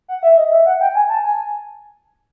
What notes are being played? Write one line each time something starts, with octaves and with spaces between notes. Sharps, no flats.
F#5
E5
D#5
E5
F#5
G5
G#5
A5
G#5